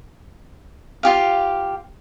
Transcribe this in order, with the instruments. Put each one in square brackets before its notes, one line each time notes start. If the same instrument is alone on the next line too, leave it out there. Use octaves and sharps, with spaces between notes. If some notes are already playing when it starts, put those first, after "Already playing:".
[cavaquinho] F4 G4 F5